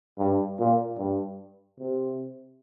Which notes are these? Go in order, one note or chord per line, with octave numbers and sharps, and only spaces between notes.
G2
A#2
G2
C3